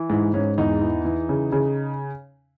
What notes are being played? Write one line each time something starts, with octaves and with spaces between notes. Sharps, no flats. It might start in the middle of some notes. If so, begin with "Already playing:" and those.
Already playing: E3
G#2 E4
G#2 C#4
E2 D#4
E3
E3
C#3
C#3